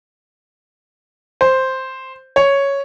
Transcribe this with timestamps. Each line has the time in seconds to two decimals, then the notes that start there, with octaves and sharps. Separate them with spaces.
1.41 C5
2.36 C#5